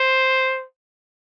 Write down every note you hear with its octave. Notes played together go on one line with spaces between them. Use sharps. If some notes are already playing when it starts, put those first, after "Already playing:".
Already playing: C5